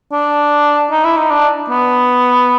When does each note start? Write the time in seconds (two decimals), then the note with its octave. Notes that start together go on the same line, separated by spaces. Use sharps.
0.12 D4
0.91 D#4
1.04 E4
1.17 D#4
1.30 D4
1.70 B3